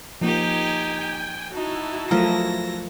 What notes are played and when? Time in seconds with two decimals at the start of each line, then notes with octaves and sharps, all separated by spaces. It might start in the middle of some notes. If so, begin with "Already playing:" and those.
0.21 F3 A#3 D#4 G4 G5 G#5
1.54 D#4 E4 F#4 A5
2.11 F3 F#3 A3 A#4 D#5 A#6